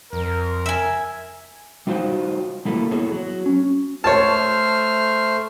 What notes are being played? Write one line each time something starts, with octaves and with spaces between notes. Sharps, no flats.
F2 A#4
E5 G#5
G3 D#4 F4 F#4 C5 G5
G3 A#3 E4 F4 A4
B3 E4 G#4 A4 C#5
F#3
C#4
A3 C5 C#5 A5 F6